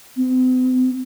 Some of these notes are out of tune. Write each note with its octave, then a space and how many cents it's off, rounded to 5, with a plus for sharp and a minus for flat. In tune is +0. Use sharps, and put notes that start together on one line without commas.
C4 -40